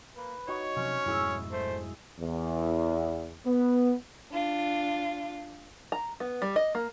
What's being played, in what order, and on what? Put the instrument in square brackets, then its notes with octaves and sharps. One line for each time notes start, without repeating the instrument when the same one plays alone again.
[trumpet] A#3 [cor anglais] B4
[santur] D#4 F#4 [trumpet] C#5
[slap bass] C3 F3 F#3 [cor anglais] C#4
[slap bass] F2 G#2 B2 [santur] E4 G#4 E6
[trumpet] A3 [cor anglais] C5
[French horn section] E2
B3
[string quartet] D4 F4
[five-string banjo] A#5
B3
G3
D#5
A#3